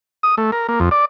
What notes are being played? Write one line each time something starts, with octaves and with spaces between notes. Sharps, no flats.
D#6
A3
A#4
A#3
F2
D5